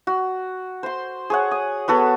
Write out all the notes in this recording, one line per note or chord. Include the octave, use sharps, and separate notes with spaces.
F#4
C5 C6
G#4 C#5 F#5
D#6
B3 F#4 A4 B4